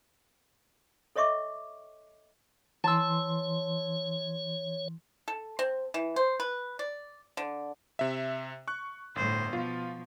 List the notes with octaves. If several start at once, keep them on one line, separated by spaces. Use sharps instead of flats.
A4 C#5 D#5 E5 C#6 D6
E3 C#5 A5 C6 E6
A4
C4
E3
C5
B4
D5
D3
C3 E5
C#6 F#6
G1 A2 C5
B2 F3 F4